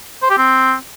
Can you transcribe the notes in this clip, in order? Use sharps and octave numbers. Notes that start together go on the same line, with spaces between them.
C5
G4
C4